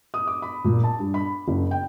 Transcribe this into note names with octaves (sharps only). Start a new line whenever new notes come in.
D#6
D6
B5
A#2
A5
G2
B5
F#1
G5